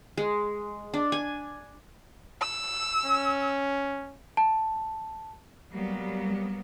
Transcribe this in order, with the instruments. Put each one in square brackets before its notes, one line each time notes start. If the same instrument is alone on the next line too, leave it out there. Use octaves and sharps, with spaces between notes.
[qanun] G#3
D4
G#5
[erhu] E6
[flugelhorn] C#4
[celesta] A5
[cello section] F#3 A#3 B3 [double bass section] G3